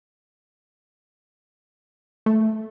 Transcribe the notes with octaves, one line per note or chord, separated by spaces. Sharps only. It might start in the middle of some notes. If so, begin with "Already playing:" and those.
A3